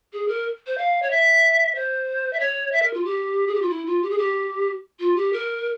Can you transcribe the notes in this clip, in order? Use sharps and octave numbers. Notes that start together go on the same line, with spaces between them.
G#4
A#4
C5
F5
C#5
E5
C5
E5
C#5
E5
A#4
F4
G4
G#4
G4
F4
E4
F4
G4
G#4
G4
F4
G4
A#4